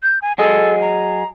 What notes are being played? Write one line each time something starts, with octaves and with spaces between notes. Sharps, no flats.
G6
G#5
F#3 G#4 A4 D#5
A#5